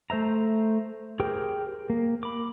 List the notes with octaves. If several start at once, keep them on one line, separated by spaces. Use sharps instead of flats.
A3 C5 E5 A#5
G4 G#4 A#4 C5 G5
A#3
B5 D6